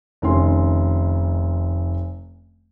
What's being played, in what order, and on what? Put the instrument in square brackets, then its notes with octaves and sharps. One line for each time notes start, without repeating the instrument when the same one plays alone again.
[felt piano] F1 D#3 C#4 C6